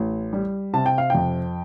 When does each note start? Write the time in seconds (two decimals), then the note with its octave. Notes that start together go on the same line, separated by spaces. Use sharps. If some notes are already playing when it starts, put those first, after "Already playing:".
Already playing: A1
0.33 G3
0.74 C3 A5
0.86 G5
0.98 F5
1.10 F2 G5